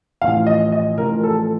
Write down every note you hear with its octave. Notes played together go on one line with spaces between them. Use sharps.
A1 A2 F3 F5
D#5
D#5
A1 A2 F3 A#4
A4